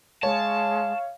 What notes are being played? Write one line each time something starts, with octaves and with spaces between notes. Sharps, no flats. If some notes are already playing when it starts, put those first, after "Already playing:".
G#3 C#5 F5 A5